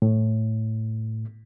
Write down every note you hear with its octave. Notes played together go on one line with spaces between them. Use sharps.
A2